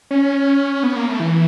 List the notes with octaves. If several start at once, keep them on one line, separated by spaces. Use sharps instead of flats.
C#4
B3
A#3
A3
E3